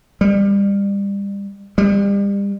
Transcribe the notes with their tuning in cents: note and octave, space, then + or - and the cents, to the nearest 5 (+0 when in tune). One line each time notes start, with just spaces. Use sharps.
G3 +30
G3 +35